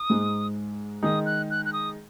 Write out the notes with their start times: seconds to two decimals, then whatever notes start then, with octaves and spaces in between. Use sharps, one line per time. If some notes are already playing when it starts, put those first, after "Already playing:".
Already playing: D#6
0.10 G#2 G#3 D#4
1.03 D#3 G#3 D#4 D#6
1.26 F#6
1.50 F#6
1.65 F#6
1.73 D#6